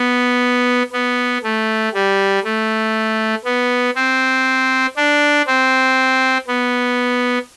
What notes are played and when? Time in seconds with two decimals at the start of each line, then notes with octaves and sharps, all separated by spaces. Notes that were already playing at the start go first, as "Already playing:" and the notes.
Already playing: B3
0.93 B3
1.44 A3
1.94 G3
2.44 A3
3.45 B3
3.96 C4
4.97 D4
5.47 C4
6.48 B3